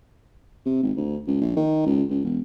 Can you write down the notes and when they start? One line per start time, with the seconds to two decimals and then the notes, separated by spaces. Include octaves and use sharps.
0.66 C3
0.83 G#1
0.97 D2
1.27 C#2
1.41 A#1
1.56 D#3
1.86 C#2
2.10 C#2
2.25 E1